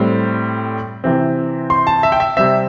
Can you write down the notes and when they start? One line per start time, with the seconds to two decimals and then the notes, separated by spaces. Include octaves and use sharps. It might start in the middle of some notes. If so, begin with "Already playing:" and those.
Already playing: A2 G3 C4
1.04 C3 E3 C4
1.70 C6
1.87 A5
2.03 E5
2.12 G5
2.20 E5
2.37 C3 G3 C4 E5